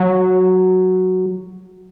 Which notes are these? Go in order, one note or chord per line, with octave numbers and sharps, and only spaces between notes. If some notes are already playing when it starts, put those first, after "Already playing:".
Already playing: F#3